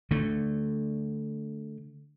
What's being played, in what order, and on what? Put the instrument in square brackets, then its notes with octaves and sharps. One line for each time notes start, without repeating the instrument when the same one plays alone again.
[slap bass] D3 A3